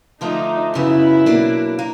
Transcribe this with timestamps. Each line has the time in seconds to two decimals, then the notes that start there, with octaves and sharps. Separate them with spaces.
0.21 D3 F3 A3 D4 D#4
0.74 F#2 C#3 F#3 B3 E4
1.26 B2 F#3 A#3 D4
1.79 A#3